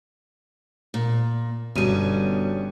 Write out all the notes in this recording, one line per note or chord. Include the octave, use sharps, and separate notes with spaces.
A#2
G1 B2 G3 C#4 D#7